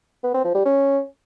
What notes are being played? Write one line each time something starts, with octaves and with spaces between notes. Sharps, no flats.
B3
C4
F3
G3
C#4